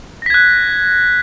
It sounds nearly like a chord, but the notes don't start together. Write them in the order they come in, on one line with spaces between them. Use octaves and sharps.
A#6 B6 G#6 F#6